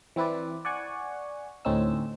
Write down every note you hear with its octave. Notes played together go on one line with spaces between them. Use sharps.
E3 C4 E4 B4 D5
D5 F#5 G#5 C#6
D2 A2 C4 C#4 D#4 E6